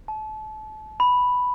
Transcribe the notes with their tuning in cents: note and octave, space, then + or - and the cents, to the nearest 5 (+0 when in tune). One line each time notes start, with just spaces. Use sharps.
A5 -30
B5 +0